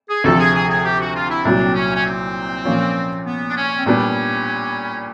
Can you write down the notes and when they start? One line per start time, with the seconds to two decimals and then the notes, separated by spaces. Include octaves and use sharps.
0.09 G#4
0.24 D2 C3 F3 A4
0.39 G#4
0.55 G#4
0.70 G#4
0.84 G4
1.00 F#4
1.15 F4
1.30 E4
1.45 C2 A#2 F#3 D4
1.63 C4
1.75 C#4
1.95 C#4
2.05 C4
2.65 A#2 F3 A#3 C#4 F4
3.26 B3
3.48 D4
3.56 C#4
3.77 C4
3.86 A#2 G3 B3 C#4 D4